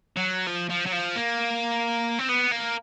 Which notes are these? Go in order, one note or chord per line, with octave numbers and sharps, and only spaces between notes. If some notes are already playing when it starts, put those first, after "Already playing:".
F#3
F3
F3
F#3
F3
A#3
C4
B3
A#3